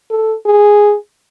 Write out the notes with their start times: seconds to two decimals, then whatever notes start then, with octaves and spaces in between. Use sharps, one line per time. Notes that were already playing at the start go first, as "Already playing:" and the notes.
0.11 A4
0.46 G#4